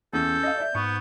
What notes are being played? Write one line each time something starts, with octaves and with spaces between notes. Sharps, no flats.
E2 C#4 A4 G6
D#5 F5
D5 E5
G#2 B3 C#6